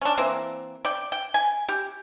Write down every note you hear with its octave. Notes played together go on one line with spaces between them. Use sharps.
C#4 D4
E3 A#3 C4
D5 G5
G5
G#5
G4